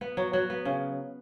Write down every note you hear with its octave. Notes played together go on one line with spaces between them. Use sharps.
B3
F#3
F#3
B3
C#3